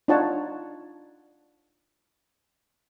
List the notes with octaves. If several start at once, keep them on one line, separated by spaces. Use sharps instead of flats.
D4 D#4 F4 C#5 F#5 A5